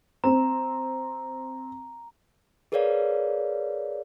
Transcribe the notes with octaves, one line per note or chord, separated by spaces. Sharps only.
C4 A#5
G#4 A#4 B4 C#5 D5 F5